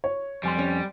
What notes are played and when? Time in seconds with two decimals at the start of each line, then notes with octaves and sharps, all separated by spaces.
0.04 C#5
0.43 F2 G3 G#5 C6
0.58 C#4